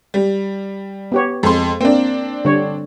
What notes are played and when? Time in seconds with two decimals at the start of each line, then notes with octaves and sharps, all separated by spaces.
0.14 G3
1.12 B3 G4 C#5
1.43 F2 G#3 C6
1.81 A#3 C4 D4
2.45 D3 G3 C#5